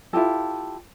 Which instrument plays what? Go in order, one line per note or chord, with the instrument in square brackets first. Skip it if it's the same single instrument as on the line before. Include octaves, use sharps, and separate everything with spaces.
[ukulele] E4 F4 G4 A4